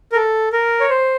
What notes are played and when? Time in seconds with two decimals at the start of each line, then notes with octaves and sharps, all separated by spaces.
0.12 A#4
0.16 A4
0.53 A#4
0.80 C#5
0.90 C5